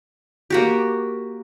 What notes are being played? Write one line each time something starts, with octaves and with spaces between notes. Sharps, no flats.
A#3 F#4 G4